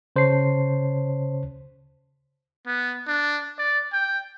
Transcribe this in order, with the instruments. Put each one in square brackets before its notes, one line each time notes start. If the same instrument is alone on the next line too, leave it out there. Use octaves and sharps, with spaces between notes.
[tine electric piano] C#3 C5 C#5 A5 C7
[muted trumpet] B3
D4
D5
G5